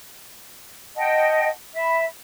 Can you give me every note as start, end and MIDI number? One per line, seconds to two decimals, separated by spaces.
0.96 1.48 75
0.96 1.48 78
0.96 1.48 79
0.96 1.48 81
1.74 2.04 76
1.74 2.04 83